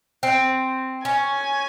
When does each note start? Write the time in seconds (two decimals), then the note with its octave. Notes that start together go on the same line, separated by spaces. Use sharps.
0.23 C4
1.05 C#4 G#5